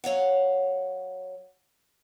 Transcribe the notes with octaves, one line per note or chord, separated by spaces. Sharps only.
F#3 C#5 F5 F#5